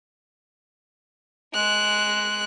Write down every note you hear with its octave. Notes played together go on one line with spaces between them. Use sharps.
G#3 F#6